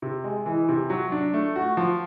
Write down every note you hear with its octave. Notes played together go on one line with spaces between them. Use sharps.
C3
G#3
E3
C3
F#3
D4
A3
F#4
F3